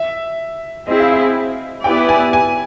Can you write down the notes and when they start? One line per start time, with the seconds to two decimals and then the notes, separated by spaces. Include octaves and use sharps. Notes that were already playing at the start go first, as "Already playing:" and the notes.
Already playing: E5
0.87 C4 E4 G#4 D#5
1.00 F5
1.12 E5
1.84 B3 E4 G4 B4 D5 G5
2.09 G#5
2.33 G#5